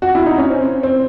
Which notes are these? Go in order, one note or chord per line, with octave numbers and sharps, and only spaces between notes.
F#4
E4
D#4
C#4
C4
C4